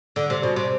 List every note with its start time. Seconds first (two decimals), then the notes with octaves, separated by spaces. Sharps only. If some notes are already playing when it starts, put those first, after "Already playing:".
0.16 D3
0.30 C3
0.43 B2
0.56 C3